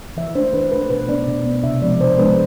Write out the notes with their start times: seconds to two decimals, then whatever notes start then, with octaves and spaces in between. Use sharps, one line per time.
0.17 E3 E5
0.35 A3 D4 C5
0.54 E3 B4
0.72 A3 D4 B4
0.90 B2 B4
1.09 B3 D4 D5
1.27 B2
1.46 B3 D4
1.64 C3 E5
1.82 F3 G#3 B3 D4 D5
2.00 C3 C5
2.18 F3 G#3 B3 D4 B4